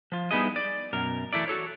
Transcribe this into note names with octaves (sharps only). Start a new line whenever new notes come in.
F3 F4
G3 B3 D#4 E4 G#4 D#5
D5
F#2 B2 A#4
E3 A3 E4 D5
F#4 A4 C#5